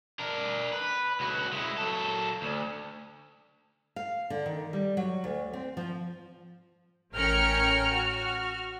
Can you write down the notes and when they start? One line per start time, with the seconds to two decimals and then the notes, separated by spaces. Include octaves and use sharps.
0.19 D4 A#4
0.72 B4
1.20 C#2 F#4
1.53 G#3 E4
1.77 F#3 A4
2.42 D2
3.96 F5
4.30 D3
4.46 D#3
4.73 G3
4.97 F#3
5.24 D2
5.53 C4
5.77 F3
7.13 A1 C#4 A#4 G5 F6 C#7
7.91 F#4 F6